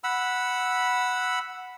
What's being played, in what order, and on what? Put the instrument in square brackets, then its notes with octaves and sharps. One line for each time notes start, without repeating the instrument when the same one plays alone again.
[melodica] F#5 B5 E6